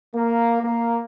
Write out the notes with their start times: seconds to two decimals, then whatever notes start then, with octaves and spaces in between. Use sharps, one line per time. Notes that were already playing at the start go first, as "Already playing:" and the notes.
0.15 A#3
0.63 A#3